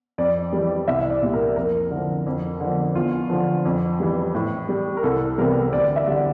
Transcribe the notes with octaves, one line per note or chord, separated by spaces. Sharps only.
F2 D5
E3 G3
C2 E5
D5
A#2 G3
A#4
F2 A#4
D3
F3
F2
D3 F3
E2 F4
D3 F3
F2
E3 G3
A2
G3
A#4
C2 A4
C3 E3 G3 A#4
D2 D5
E5
D3 G3